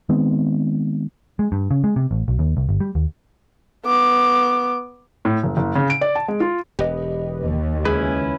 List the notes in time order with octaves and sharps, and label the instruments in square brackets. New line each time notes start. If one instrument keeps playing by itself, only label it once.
[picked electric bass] D#3 G#3 B3 C4
G#3
G2
C#3
G#3
C3
A1
B1
D#2
C2
G1
G3
D#2
[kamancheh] B3 D6
[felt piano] A2
F#1
F#1
C#3
D7
D5
A5
G#3
F4
[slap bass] E1 [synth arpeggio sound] G4 B4 D#5
[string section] D#2
[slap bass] C#2 [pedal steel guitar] C#4 E4 B4 [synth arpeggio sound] G#4